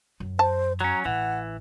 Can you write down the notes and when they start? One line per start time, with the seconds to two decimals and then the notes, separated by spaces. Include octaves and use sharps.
0.20 F#2
0.39 C5 A5
0.81 F#3 C#4 A#5
1.05 A1 E3 F#5